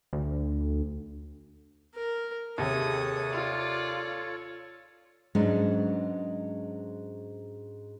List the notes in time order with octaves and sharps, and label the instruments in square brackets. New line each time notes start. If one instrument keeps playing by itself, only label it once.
[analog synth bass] D2
[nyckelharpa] A#4
[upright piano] D#2 C3 [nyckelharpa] G#4 D#6 [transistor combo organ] A4 C#5
[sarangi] F4 [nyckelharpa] D5
[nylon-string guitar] G#2 F#3 G#3 B3 C#4 D4